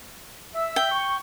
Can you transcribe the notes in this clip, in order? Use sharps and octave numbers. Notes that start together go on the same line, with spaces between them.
E5 E6
G5
C#6